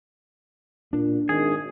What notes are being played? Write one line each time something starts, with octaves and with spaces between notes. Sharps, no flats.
A#2 D4
G#1 G#4